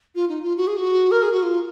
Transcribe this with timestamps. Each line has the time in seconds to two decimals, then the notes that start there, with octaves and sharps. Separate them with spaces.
0.15 F4
0.29 D#4
0.43 F4
0.57 F#4
0.67 G#4
0.77 F#4
1.11 A#4
1.22 G#4
1.32 F#4
1.42 F4